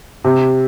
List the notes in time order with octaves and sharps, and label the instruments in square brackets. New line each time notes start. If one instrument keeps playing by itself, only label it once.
[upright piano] C3